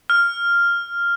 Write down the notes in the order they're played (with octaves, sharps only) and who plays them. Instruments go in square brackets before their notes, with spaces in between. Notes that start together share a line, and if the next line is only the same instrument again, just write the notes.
[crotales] F6